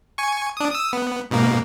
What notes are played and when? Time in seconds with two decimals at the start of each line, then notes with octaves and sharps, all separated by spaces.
0.18 G#5 C#6
0.57 D4 D#6
0.71 D#6 E6
0.93 B3
1.31 G#2 B2 A#3